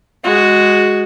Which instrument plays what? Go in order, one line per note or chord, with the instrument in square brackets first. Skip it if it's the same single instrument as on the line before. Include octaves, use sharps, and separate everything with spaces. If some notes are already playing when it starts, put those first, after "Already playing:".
[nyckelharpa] G#3 F#4